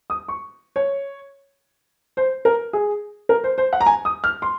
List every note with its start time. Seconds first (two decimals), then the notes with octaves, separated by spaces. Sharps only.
0.10 D#6
0.28 C#6
0.76 C#5
2.17 C5
2.45 A#4
2.73 G#4
3.29 A#4
3.44 C5
3.58 C5
3.73 F#5
3.81 A#5
3.86 G#5
4.05 D#6
4.24 F6
4.42 C6